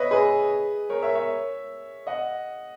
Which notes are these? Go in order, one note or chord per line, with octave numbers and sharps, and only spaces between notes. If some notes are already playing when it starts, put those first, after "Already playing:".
Already playing: B4 C#5 D#5 E5
G#4 B4
A#4 C#5
C#5 E5
C#5 E5
D#5 F#5